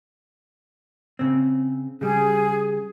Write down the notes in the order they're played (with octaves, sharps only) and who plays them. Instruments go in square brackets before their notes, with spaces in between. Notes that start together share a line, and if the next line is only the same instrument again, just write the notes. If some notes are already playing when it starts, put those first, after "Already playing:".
[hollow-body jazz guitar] C#3 C4
[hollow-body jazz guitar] C#3 G3 [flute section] G#4